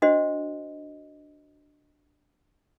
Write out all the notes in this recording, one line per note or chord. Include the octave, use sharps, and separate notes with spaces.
D4 F#4 C5 D#5